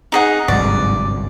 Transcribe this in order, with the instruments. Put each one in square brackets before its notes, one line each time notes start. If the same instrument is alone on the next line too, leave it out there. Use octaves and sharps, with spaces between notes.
[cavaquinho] D#4 G#4 F#5
[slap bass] G1 C2 [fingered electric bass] G#2 F#3 [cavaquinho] D5